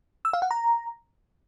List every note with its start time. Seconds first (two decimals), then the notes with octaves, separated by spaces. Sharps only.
0.25 E6
0.33 F5
0.42 F#5
0.51 A#5